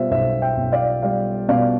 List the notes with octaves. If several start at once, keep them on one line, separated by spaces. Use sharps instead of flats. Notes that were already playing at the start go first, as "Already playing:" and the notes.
Already playing: B2 G3 F4 C5 E5
B1 C5 E5
E5 G5
B1
D5 F5
G3 D5 F5
B2 D5 F5